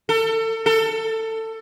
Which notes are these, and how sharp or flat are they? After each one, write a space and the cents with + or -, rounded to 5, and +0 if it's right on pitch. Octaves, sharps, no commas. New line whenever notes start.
A4 +30
A4 +20